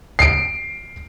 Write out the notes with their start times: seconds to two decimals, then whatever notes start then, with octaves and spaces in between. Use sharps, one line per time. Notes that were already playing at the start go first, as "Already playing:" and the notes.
0.19 C7 D7